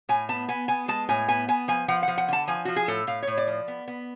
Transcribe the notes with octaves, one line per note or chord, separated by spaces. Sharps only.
A2 G#5
B3 A5
B3 G#5
B3 G#5
G#3 A5
A2 G#5
B3 G#5
B3 G#5
F3 G#5
F3 F#5
F#5
F3
F#5
D3 A5
F3 G#5
F3 F#4
G#4
A2 A4
A2 F5
A2 C#5
D5
F3
B3
B3